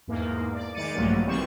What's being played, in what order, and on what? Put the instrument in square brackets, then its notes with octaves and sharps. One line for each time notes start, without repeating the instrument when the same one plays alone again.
[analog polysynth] E2 G#2 A#3
D5
D#3 G#3 D5 A6 C#7 D#7
A#1 G2 F3 F#3 A3 A#3
D#3 E3 G3 C4 C#6 E7